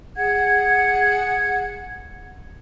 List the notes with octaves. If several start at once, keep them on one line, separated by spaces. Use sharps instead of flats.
G#4 F#5 G#6